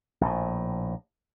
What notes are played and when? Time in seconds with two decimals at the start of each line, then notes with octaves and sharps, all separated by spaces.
0.21 A#1 A2